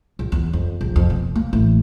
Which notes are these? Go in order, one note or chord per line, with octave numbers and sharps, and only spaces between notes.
A#1
E2
F2
A#1
F2
B2
A#3
A1